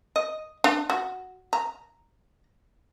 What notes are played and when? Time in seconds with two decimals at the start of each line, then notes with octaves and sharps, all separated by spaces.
0.16 D#5
0.64 D4
0.90 F#4
1.53 A#5